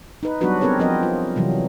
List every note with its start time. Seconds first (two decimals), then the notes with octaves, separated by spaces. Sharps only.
0.23 D#4 B4
0.41 F#3 G3 B3 D4 F#4 B4
0.61 B3 C4 G#4 A#4 B4 C#5
0.79 F3 B3 C4 A#4 D#5
1.03 F4
1.36 C3 E3 F#3 G3